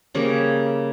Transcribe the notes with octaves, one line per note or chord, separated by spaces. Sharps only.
C#3 G3 A#3